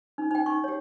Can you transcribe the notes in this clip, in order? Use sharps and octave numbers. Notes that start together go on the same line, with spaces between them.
D#4
D#4 G5
D#4 C#6
G4 C#5